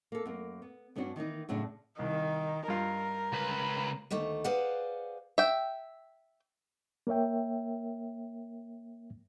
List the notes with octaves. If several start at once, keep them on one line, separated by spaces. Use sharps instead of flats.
A#3 A4
F#2 A#3
B3
G2 B3 C#4 D4 F#4
D#3 E3 A#3 D#4
F#2 A2 C#3 D4
C2 D#3
G2 F4 A#4
C#2 B4
D2 D#3 A3 A#3
G#4 B4 C5 D5 F5 F#5
E5 G5
A#3 A#4 C#5 E5 G5